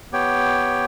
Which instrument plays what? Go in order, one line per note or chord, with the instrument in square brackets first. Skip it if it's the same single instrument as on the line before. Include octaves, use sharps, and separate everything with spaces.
[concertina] B3 G4 C#5 G5